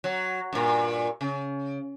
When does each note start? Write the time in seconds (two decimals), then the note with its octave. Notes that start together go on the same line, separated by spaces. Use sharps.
0.04 F#3
0.53 G2 A#2
1.21 C#3